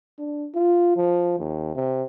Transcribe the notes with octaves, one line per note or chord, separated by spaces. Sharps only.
D4
F4
F3
D#2
C3